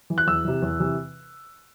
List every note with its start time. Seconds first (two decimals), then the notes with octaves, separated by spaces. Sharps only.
0.10 E3
0.18 F#6
0.27 E2 E6
0.44 C3 E3
0.62 E2
0.80 C3 E3